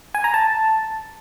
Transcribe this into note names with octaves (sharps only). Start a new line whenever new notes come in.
G#5
A#5
A5